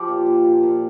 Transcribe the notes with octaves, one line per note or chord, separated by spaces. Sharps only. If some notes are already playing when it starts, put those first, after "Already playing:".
Already playing: F3 G4
A#2
A#2
A#2
A#2